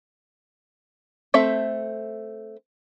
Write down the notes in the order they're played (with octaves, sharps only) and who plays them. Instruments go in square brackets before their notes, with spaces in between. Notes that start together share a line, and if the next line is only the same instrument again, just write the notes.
[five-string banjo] A3 C4 A4 E5